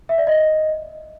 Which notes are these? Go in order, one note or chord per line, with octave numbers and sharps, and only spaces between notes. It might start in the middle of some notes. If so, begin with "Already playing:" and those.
E5
D5
D#5